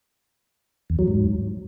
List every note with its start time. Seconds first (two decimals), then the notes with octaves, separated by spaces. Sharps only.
0.90 E2
0.99 F#3
1.08 G#2